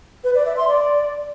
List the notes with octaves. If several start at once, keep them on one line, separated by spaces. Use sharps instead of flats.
B4
D5
E5
C6
D5